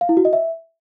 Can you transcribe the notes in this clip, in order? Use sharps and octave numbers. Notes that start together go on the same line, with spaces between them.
F5
E4
F#4
D#5
E5